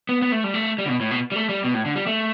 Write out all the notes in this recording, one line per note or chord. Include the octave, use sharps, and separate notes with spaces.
B3
B3
A3
G3
A3
G3
D3
B2
A2
B2
G3
A3
G3
B2
A2
D3
G3
A3